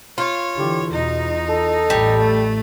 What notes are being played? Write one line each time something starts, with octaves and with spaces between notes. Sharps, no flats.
F4 C#5
D3 E3 G4
E2 B2 D#4
A4
A1 G3
A3